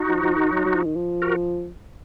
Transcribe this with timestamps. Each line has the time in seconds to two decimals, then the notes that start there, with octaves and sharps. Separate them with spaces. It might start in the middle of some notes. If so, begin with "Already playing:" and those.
Already playing: D#4 F#4
0.08 F3
0.23 F3
0.36 D#3
0.51 F#3
0.65 F#3
0.75 F3
0.85 D#3
0.95 F3
1.22 F#4 A#4